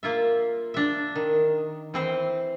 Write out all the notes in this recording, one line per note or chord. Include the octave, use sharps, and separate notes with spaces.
A#3 F4 E5
D4 E5
D#3
E3 C4 C5